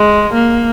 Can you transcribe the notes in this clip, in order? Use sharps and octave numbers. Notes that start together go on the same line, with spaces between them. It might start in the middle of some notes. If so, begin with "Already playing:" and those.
Already playing: G#3
A#3